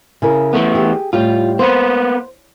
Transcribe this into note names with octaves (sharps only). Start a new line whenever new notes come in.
C#3 E4 A#4
E3 A3 B3
G4 G#4
A2 G3 F4 G4
A#3 B3 B4 C5